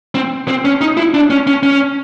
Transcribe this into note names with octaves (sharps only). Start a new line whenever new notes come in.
C4
C4
C#4
D#4
E4
D4
C#4
C#4
C#4